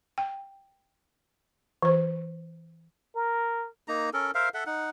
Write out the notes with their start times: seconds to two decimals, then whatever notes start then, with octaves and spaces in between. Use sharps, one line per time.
0.18 G5
1.82 E3 C5
3.15 A#4
3.88 A#3 D#4 A#5
4.14 C#4 A4 A#4
4.35 A#4 C5 E5 F5
4.54 A4 E5 F#5
4.66 D#4 F#5